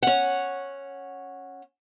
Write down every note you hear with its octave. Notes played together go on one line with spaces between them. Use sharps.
C#4 F#5